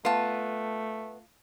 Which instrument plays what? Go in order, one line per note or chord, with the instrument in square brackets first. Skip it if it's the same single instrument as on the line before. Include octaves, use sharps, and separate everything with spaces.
[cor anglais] A3 [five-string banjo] B3 [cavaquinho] F4 A5